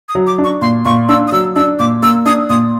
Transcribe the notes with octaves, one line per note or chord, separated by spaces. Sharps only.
D#6
F#3
D6
D4
C#6
A#2 C6
A#2 C#6
D4 E6
D#6
F#3 E6
D4 E6
A#2 D6
A#3 E6
D4 D#6
A#2 D#6